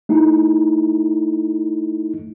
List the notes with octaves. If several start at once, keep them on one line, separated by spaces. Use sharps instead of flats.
A3 D#4 E4